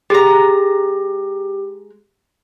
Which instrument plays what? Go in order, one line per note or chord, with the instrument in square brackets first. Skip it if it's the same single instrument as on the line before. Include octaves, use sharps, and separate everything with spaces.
[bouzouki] G#3 A#5 [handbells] G4